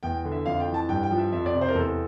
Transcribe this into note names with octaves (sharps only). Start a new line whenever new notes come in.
E2 G5
D3
E5
F2 F5
G5
E3
A5
G2 G5
G5
F3
E5
F2 E5
D5
C3
C5
A#4
E2 A4